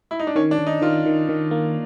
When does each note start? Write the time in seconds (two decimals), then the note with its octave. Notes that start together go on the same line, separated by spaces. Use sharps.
0.11 E4
0.19 D#4
0.27 D4
0.36 D#3 C#4
0.51 D4
0.59 D#3
0.67 D#4
0.82 D#3 F4
1.06 D#3
1.29 D#3
1.51 A#3